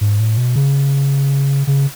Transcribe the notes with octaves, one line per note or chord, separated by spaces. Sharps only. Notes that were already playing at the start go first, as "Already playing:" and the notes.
G#2
A2
B2
C#3
C#3